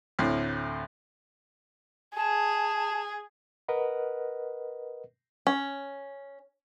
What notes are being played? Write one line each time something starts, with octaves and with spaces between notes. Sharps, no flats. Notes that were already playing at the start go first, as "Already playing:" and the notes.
D2 A2 C4
G#4 A5
A#4 B4 D#5 F#5
C#4